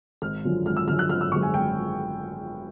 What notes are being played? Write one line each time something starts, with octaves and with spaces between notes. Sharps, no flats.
G#1 F6
F#2 D3 F3 G#3
G#1 F6
E6
F#2 D3 F3 G#3 F6
F#6
G#1 F6
E6
F#2 D3 F3 G#3 C#6
G#5
G#1 G5